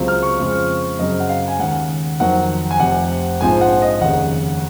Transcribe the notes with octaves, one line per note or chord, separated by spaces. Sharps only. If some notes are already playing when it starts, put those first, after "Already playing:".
Already playing: C#2 C3 F#3 C4 F4
F6
C#6
F2 C#3 G#3 C4 F4
F#2 C#3 F#3 C4 D#5
F#5
F5
G#5
D#2 C#3 G#3 F#5
F2 D#3 F#3 F#5
G#5
F1 F2 C3 F#5
A#1 G#2 F3 C4 G#5
F#5
D#5
F1 D#2 C#3 F#5